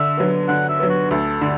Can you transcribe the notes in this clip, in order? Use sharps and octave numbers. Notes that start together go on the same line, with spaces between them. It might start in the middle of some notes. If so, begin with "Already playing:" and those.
Already playing: D3 E5
F#3 B3
D3 F#5
E5
F#3 B3
F#4
D2 A4
D3